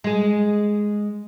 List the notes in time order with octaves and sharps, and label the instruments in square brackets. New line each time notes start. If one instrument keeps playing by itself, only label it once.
[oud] G#3 G#4